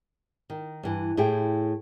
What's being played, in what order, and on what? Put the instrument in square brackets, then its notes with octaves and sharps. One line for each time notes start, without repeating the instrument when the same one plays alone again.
[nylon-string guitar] D#3
G2 E3
A2 E4 G4 G#4 G5